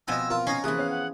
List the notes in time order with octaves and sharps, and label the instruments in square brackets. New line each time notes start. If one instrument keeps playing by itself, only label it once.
[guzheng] B2 F3 C4 [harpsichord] D#5 G#5 [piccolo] E6
[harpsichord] F4 [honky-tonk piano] A#4
[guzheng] C#4 [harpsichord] D#4 G#5 A#5 [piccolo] C7
[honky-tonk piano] C3 A#3 E5 [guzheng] E3 F3 [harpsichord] G#4 [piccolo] F#6
[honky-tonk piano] B3 C#4 F5
[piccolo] F#5